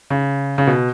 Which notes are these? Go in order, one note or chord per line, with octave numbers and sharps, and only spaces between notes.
C#3
C#3
B2